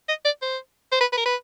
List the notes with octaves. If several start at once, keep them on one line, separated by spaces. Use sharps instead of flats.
D#5
D5
C5
C5
B4
B4
A#4
B4